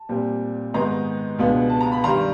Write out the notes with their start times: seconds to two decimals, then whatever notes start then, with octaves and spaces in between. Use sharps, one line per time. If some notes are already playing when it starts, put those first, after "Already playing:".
Already playing: A5
0.09 A#2 G3 C4
0.74 G#2 D#3 G#3 B3 D#4 A#5 C6
1.39 C#2 B2 G#3 B3 D4
1.69 A5
1.81 A#5
1.92 B5
2.04 G2 D#3 G3 A#5 C6